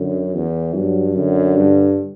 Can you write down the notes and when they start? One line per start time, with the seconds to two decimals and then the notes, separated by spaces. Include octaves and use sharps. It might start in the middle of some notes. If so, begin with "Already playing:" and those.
Already playing: F#2 D3
0.35 E2
0.75 G2 F#3
1.16 F#2 D3
1.57 G2